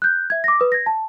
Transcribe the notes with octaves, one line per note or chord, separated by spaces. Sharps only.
F#6 G6
E5 G#6
D6 A#6
B4 D#6
G#6 A#6
A5